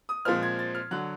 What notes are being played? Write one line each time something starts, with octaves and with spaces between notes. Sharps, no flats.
D#6
A#2 F3 G#3 C4 F4 F6
G#6
A6
F6
D3 F#3 F#6